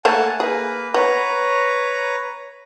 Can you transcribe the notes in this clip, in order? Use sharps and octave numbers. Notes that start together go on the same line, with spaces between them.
A3 A#3 A4 F#5 G#5 A5
A#3 G#4 B4
B3 B4 C#5 A#5